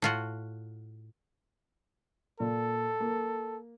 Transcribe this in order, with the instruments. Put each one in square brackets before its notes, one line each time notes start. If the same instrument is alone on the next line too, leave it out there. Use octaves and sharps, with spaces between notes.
[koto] A2 F4 F#4
[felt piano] A#2 [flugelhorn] A4
[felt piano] A#3